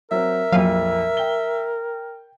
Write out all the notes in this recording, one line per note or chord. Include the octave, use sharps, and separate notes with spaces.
F#3 C4 A#4 E5
A#1 F2 F#3 F5 D#7
G5 G7